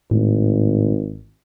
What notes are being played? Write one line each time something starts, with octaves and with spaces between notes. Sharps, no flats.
G#1 A2